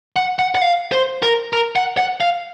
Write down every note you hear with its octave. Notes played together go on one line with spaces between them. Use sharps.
F#5
F#5
F#5
F5
C5
A#4
A#4
F#5
F#5
F5